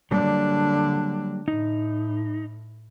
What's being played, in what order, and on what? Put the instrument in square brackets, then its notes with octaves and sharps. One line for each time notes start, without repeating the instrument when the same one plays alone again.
[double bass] D3 D4 [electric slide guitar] F#3 G3 A#3
[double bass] A2 [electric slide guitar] D#4